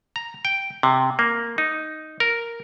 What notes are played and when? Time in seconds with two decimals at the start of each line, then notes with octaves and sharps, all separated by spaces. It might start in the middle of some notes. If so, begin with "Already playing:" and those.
0.16 A#5
0.45 G5
0.83 C3
1.19 A#3
1.58 D#4
2.20 A#4